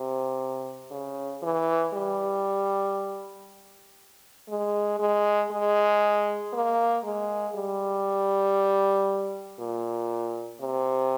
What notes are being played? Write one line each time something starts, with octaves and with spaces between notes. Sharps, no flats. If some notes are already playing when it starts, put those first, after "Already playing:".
Already playing: C3
C#3
E3
G3
G#3
G#3
G#3
A#3
G#3
G3
A#2
C3